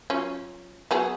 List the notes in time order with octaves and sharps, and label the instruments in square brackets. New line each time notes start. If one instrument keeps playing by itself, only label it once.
[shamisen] F#3 C#4 F4
F#3 B3 G#4